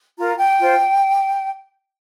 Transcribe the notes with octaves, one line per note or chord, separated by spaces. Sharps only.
F4 A#4 A#5
G5
F4 C5